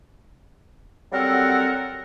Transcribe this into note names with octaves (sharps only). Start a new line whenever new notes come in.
F#3 G3 C4 A4 A#4 F#5